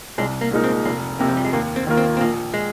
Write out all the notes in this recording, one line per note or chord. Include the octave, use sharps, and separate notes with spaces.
C2 G#3
A#3
A#2 G#3 D#4 A#4
C4
F1 A#3
F2 C3 A#3
F3
G3
G#3
D#2 A#3
C4
D#3 A#3 F4 A#4
C4
C4
A#1 A#3
G#3